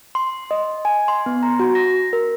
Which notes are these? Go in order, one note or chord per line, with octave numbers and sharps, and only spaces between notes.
C6
D#5
G#5
C6
B3
A#5
F#4
A#6
A#4